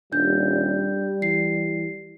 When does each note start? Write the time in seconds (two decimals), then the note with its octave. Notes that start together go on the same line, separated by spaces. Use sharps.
0.12 D#1 G3 D4 G6
1.22 E3 C7